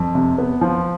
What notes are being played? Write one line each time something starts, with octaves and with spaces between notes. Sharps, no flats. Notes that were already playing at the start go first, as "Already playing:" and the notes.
Already playing: F2
C3
B3
F3